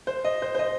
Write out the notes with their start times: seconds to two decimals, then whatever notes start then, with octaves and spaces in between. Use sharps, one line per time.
0.07 C5
0.24 D#5
0.42 C5
0.55 C5
0.59 D#5